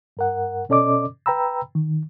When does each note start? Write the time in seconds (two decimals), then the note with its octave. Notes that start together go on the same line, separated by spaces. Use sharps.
0.17 G2 A#4 F#5
0.69 B2 C#4 A4 D5 D#5 D6
1.26 B4 G5 A#5 B5 E6
1.75 D#3